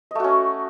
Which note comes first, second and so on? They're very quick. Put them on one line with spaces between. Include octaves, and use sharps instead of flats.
D#5 A3 F#4 C#4